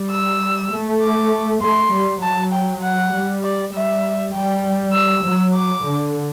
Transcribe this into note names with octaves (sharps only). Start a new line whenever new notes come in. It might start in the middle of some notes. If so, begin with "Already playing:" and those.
Already playing: G3
E6
A3
D6
A3 C6
G3
F#3 A5
G5
F#5
G3
D5
G3 E5
G3 G5
E6
F#3
D6
D3